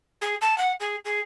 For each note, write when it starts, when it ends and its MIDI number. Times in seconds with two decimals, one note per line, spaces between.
0.21 0.34 68
0.41 0.57 81
0.58 0.72 78
0.80 0.95 68
1.05 1.20 68